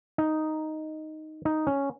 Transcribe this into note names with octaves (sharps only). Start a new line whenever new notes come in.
D#4
D#4
C#4